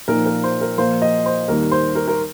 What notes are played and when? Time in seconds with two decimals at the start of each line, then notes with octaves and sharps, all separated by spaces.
0.08 A#2 F3 D#4 A#4
0.26 A#4
0.44 C5
0.61 A#4
0.78 A#2 F3 A#3 F4 C5
1.02 D#5
1.26 C5
1.48 D#2 D#3 G3 A#4
1.71 C5
1.95 A#4
2.08 A#4